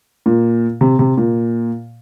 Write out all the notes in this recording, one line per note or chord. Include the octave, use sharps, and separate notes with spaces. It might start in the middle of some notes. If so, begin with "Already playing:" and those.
A#2
C3
C3
A#2